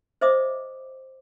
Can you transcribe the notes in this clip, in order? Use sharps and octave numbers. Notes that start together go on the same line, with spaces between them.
C5 D#5 E5 D6 D#6